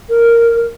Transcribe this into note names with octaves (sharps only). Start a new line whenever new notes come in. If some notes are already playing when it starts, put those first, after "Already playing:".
A#4